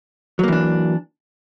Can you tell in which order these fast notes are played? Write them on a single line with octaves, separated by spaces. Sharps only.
F#3 A#3 E3 D4